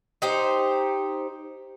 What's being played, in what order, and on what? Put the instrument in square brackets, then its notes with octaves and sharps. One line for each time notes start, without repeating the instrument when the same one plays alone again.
[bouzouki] D#4 G4 C5